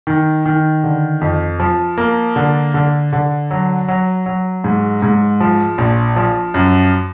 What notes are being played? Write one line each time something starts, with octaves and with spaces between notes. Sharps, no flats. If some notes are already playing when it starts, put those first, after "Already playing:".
D#3
D#3
D3
F2
F3
A#3
D3
D3
D3
F#3
F#3
F#3
G#2
G#2
F3
A#1
F3
F#2